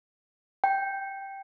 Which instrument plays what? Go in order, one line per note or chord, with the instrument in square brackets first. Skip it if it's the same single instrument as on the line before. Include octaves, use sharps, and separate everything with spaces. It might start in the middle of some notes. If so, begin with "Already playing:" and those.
[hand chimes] G5